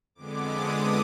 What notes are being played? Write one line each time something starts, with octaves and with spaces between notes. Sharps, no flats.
F2 D3 G#3 B3 D6
D#6